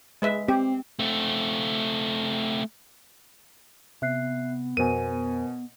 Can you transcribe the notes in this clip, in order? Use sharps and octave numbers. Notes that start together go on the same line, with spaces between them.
G#3 B4 E5
C4 G4
A3 C4
C3 B3 E5 F#6 C7
F2 B2 A#4 C5 G#5 D#7